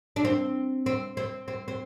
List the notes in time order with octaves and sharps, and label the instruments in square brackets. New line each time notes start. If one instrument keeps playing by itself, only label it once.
[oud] D4
C4
C4
C4
C4
C4